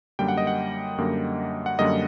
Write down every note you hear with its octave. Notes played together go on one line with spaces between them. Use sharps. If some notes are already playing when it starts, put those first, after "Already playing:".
F#2 D3 G3 A#3 G5
F#5
D#5
F#5
F#2 D3 G3 A#3
F#5
F#2 D3 G3 A#3 D#5